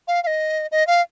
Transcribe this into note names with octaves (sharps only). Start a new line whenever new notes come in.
F5
F5
D#5
D#5
F5